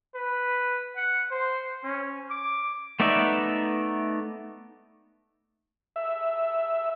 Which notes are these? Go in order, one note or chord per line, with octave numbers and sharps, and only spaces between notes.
B4
F#5
C5
C#4
D6
A3 B3 D#4 D5 E5
E5